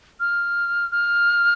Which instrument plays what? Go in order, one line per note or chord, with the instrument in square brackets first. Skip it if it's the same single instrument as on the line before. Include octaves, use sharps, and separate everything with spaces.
[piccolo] F6
F6